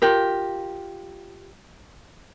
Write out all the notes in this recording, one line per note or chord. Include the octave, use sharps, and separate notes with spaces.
F4 G4 A#4